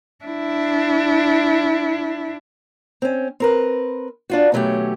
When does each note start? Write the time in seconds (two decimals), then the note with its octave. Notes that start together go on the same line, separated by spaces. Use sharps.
0.25 D4 E4
3.02 C4 C#4
3.40 C4 A#4 B4
4.30 D4 F4 F#4
4.52 B2 D#3 F#3 A3 C#4 G4